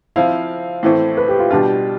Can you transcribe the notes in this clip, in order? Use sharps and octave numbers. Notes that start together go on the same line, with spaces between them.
F3 C4 E4 F5
A2 E3 A3 C4
B4
G4
F4
B2 G3 D4 F4 G4